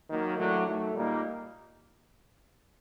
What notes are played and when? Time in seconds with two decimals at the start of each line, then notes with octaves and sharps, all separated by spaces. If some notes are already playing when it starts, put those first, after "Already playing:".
0.09 D#3 F#3 A#3
0.37 A2 F#3 A3 D4
0.66 D#3 F#3 A3
0.94 A#2 G3 A#3 D#4